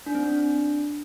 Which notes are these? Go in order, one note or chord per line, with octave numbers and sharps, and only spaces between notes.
D4
C4
D4